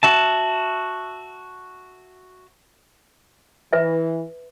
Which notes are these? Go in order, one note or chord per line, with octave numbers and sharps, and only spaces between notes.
F#4 E5 A5
E3 B4 E5